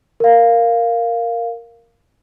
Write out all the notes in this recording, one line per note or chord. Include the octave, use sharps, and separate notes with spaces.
A#4 F5